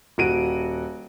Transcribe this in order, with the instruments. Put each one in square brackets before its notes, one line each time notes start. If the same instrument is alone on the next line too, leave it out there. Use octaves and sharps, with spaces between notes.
[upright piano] D#1 F#4 D7 D#7